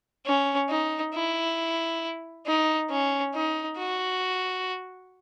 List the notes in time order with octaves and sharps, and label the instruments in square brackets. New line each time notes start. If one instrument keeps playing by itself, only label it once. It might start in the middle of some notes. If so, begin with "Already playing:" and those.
[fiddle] C#4
D#4
E4
D#4
C#4
D#4
F#4